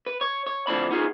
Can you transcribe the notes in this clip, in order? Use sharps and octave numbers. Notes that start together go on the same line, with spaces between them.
B4
C#5
C#5
D2 A2 F3 C4 D4 B5
B3 D#4 F4 G#4